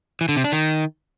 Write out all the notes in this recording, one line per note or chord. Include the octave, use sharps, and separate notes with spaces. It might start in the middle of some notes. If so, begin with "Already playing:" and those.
E3
D3
C3
D4
D#3